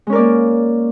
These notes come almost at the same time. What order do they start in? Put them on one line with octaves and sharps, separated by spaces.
G#3 C#4 A#4 D5 A#3